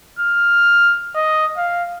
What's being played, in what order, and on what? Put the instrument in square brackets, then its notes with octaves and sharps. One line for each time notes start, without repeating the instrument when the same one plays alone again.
[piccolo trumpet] F6
D#5
F5